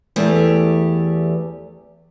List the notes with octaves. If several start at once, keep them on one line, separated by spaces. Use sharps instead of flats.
E2 A3 G4